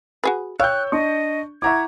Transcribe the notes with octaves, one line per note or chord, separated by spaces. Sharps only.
F#4 G#4 B4
C#5 F5 G5 E6 F#6 G6
D4 D#5 C#6
E4 E5 F#5 A#5 C#6 D6 G#6